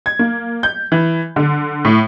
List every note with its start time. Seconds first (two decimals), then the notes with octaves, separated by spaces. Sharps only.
0.06 G#6
0.19 A#3
0.63 G6
0.92 E3
1.36 D3
1.85 A2